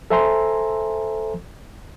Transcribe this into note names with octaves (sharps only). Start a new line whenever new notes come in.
A4 C5 E5 G#5 A#5 C6